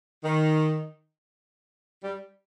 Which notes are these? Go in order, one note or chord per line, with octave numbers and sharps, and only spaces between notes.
D#3
G3